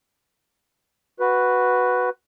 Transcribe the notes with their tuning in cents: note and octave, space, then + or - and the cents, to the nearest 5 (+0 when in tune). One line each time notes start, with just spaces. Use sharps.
F#4 +0 B4 +0